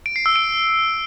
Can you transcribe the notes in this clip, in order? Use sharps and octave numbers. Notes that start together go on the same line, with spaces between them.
D7
C7
E6
D7